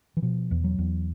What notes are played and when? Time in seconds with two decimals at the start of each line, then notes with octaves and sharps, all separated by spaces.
0.17 E3
0.22 B2 F3
0.51 E2
0.64 F#3
0.78 E2